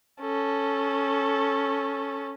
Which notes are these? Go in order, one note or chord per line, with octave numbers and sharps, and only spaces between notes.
C#4 A4